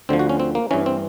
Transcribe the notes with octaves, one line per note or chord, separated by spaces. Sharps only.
D2 D3 F3 C4
F#4
C#4
C4
A#3
G2 E3 C#4
C4